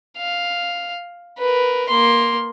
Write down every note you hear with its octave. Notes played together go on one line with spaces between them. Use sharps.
F5
A#4 B4
A#3 C6